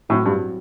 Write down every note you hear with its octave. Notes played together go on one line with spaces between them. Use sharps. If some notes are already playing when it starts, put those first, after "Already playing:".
A2 F#3 C4 E4
G2